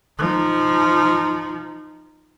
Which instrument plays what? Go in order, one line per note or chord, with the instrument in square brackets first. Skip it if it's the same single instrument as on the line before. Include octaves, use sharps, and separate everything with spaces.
[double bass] F3 D#4